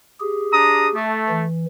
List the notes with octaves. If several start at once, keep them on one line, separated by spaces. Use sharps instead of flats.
G4 G#4
D4 A#5 D#6
A3
E3